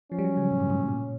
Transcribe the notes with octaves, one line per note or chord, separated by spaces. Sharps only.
F3 C#4
G3
F#3
C#3
A2
G2
G#2
A2
A#2